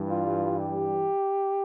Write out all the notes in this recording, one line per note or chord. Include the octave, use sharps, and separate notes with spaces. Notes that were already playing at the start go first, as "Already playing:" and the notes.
Already playing: G2 E3 G3
F4
G4